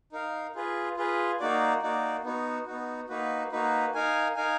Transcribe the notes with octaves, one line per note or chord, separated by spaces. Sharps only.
D#4 A#4 F5
F4 G#4 B4
F4 G#4 B4
A#3 D#4 F#4 D5
A#3 D#4 F#4 D5
B3 D#4 F#4
B3 D#4 F#4
A#3 D#4 F#4 B4
A#3 D#4 F#4 B4
D#4 A#4 F5 G#5
D#4 A#4 F5 G#5